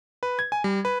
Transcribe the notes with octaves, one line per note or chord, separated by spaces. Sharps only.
B4
G#6
G#5
G3
B4